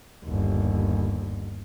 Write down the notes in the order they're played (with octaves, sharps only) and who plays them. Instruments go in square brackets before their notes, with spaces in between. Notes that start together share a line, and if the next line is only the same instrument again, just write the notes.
[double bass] G1 D#2